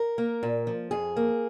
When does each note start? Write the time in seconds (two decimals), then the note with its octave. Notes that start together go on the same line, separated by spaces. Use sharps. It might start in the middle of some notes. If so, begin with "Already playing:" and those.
Already playing: A#4
0.18 A#3
0.43 A#2
0.67 F3
0.91 F2 G#4
1.16 A#3